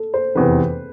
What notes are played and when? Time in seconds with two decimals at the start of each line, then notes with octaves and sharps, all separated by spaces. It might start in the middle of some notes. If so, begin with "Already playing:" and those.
Already playing: A4
0.14 C5
0.35 F1 E2 C3 B4